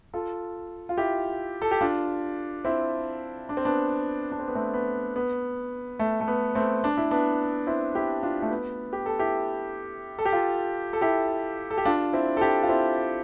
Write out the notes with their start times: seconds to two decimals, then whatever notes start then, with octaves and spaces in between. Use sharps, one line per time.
0.14 F4 A4
0.89 F4
0.97 E4 G4
1.62 A4
1.71 G4
1.81 D4 F4
2.65 C4 E4
3.49 D4
3.57 C4
3.65 B3 D4
4.32 D4
4.40 C4
4.48 B3
4.55 A3 C4
4.74 B3
5.16 B3
5.99 A3
6.21 A3
6.28 B3
6.55 A3 C4
6.84 D4
6.97 E4
7.11 B3 D4
7.67 C4 E4
7.95 E4 G4
8.23 D4 F4
8.42 A3
8.51 B3
8.93 G4
9.06 A4
9.19 E4 G4
10.19 A4
10.25 G4
10.33 F4 A4
10.93 A4
11.01 E4 G4
11.71 A4
11.78 G4
11.85 D4 F4
12.13 C4 E4
12.37 A4
12.41 E4 G4
12.63 F4
12.69 C4 E4